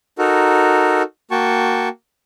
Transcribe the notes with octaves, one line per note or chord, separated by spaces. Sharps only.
D#4 F#4 A4 A#4
A#3 F#4 G5 A5 C#6